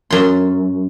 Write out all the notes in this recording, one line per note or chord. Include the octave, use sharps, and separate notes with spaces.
F#2 C6